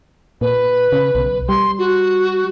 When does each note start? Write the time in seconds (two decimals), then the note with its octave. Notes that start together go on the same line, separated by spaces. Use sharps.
0.41 A#2 B4
0.92 C#3
1.15 B1
1.49 G3 C6
1.79 F#4